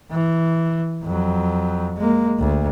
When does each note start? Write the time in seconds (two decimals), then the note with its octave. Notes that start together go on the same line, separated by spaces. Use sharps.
0.11 E3
1.04 F2 F#3
1.97 G#3 A#3
2.39 D2